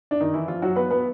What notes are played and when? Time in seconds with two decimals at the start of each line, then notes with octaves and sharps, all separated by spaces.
0.11 D4
0.21 D#3 D#4
0.34 E3 E4
0.48 F3 F4
0.62 F#3 F#4
0.76 B3 B4
0.90 B3 B4